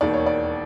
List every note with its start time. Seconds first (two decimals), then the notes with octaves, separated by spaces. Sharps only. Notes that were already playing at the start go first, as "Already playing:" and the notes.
0.01 E1 D#2 D#3 D5
0.13 C#5
0.26 D5